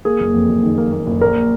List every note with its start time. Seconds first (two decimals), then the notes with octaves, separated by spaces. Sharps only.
0.05 A#3 G#4
0.20 F#1
0.34 F2
0.49 F#1
0.63 D#3
0.78 A#3
0.92 A#3
1.07 F#1
1.21 A#1 A#4